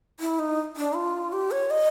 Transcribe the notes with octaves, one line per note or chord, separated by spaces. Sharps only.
E4
D#4
D4
F4
G4
C#5
D#5